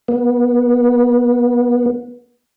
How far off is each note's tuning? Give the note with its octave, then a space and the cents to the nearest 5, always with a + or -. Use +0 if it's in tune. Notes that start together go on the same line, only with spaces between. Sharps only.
B3 -25